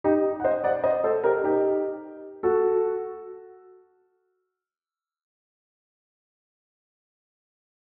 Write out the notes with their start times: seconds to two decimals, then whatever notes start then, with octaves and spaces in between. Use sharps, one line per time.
0.04 D#4 G4
0.40 F#5
0.44 C5 D#5
0.64 D5 F#5
0.84 C5 D#5
1.04 A4 C5
1.24 G4 A#4
1.44 D#4 G4
2.43 F#4 A4